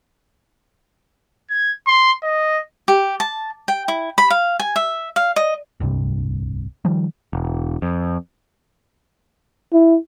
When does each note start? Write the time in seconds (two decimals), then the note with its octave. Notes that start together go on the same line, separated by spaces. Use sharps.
1.50 G#6
1.87 C6
2.23 D#5
2.88 G4
3.20 A5
3.68 G5
3.88 E4
4.18 B5
4.30 F5
4.60 G#5
4.76 E5
5.16 F5
5.36 D#5
5.80 D1 C2 G2 C3
6.85 D#3 F3 G3
7.33 E1
7.82 F2
9.73 E4